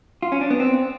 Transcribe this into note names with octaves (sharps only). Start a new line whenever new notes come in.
F4
C#4
D4
B3
C4